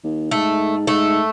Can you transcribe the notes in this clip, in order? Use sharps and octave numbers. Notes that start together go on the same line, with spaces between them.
D#2
G#2 A3
G#2 A3